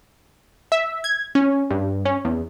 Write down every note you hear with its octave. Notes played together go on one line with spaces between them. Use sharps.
E5
G#6
C#4
G2
C#4
E2